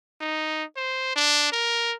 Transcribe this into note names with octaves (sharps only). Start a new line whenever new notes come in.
D#4
C5
D4
A#4